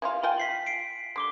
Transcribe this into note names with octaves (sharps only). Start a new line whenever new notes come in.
E3 G3 F4
F4 G5 G#5
B6 C7 F#7
C7 D7
D3 G3 C6 D6 G7